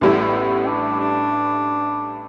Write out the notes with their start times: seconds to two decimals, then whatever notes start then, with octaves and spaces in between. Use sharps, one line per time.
0.01 A1 A2 G3 D4 E4
0.12 B3
0.21 A3
0.31 B3
0.66 D4
1.00 D4